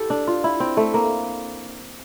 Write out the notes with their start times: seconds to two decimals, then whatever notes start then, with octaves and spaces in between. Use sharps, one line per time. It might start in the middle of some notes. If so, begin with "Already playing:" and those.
Already playing: E4 G4 A4
0.10 D4
0.27 F4
0.44 E4
0.60 C4
0.77 A3
0.94 A#3